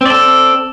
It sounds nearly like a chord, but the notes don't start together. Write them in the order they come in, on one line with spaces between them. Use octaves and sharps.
C4 D5 A4